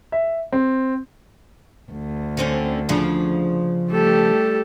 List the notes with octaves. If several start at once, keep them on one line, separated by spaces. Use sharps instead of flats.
E5
C4
D2
D3 C4 C#4
C#3 F3 D4
G3 A3 G4 A4